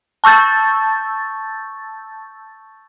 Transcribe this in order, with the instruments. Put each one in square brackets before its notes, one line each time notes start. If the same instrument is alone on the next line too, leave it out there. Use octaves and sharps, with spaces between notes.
[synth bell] A5 C#6 E6 G6 A6